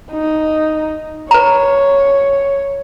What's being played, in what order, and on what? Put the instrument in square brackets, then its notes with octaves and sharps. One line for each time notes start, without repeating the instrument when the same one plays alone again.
[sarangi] D#4
[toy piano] B4 A#5 [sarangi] C#5